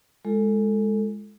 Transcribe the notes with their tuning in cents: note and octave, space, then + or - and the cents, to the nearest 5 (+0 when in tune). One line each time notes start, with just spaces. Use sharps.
G#3 +0 F4 -20 A4 +10